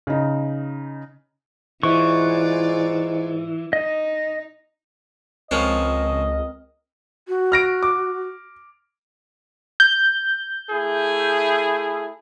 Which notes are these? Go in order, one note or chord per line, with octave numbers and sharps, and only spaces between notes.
C#3 D#4
G#2 E3 F4 D5 C#6
D#4 D#5
C#2 F3 C4 C#4 A#4 C5 D#5 F6
F#4
F6 A#6 D7
D6
G6
A3 E4 G#4